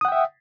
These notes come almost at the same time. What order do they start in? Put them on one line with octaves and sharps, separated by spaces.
D#6 F#5 G5 E5